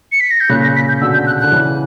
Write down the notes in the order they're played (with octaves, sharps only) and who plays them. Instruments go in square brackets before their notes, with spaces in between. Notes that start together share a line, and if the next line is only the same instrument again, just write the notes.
[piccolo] C#7
B6
A#6
G6
[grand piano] A#2 C#3 [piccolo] F#6
[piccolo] A#6
B6
G6
[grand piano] B2 D3 [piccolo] E6
[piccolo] G6
F#6
[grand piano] D3 [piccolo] F#6
[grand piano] C#3 E3